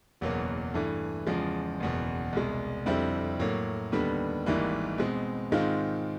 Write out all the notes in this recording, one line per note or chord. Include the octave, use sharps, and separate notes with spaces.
F#1 E2 B2 F#3 A#3
G2 E3 A3
E2 C#3 F3 G#3
F#1 E2 B2
C2 B2 G#3
F2 D3 G3 C4 E4
A2 F#3 A#3
D#2 D3 G3 B3
G#1 G#2 E3 G3 A#3
B2 G#3 C4
G#2 D#3 G#3 C4 F4